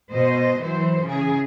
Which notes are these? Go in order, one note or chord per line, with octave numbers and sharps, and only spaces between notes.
B2 C5 D#5
E3 F#3 C5
C#3 E3 G#4